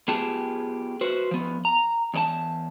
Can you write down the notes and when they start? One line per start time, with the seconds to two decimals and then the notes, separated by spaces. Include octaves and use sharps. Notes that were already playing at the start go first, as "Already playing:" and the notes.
0.08 B3 F4 G4 G#4 A5
1.01 F#4 B4 C5
1.31 F3 B3
1.65 A#5
2.14 E2 D4 A5